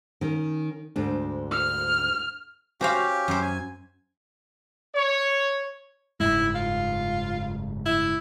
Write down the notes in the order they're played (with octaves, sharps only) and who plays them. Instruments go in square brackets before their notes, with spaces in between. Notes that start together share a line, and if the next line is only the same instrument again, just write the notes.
[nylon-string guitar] D#3 C#4
D2 G#2 D4
[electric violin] F6
[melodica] C#4 G4 [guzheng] F#4 C5 F5
[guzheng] F#2 C5
[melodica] G#5
[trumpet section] C#5
[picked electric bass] F#1 G#2 G#3 [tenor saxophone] E4
[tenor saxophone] F4
E4